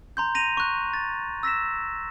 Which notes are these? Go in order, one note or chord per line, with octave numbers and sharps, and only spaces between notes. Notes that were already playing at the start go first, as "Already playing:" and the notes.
A#5 C6 G6
A#6 D#7 F7
C#6 F#6
A6
E6 A#6 B6 E7